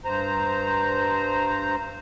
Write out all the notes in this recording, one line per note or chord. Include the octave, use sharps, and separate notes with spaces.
G2 C5 A#5